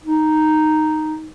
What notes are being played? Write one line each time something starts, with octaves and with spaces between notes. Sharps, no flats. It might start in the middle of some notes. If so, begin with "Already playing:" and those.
D#4